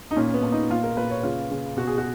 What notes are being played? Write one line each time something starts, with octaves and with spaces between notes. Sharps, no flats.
D#4
A#2 C#4
B3
A#2
D#4
A#2 F4
A#4
A#2 B4
C#5
C#3 F4
C#3
B2 F#4
G#4
F#4